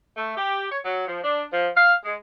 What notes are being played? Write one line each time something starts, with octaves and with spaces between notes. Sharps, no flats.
A3
G4
C#5
F#3
F3
D4
F3
F5
G#3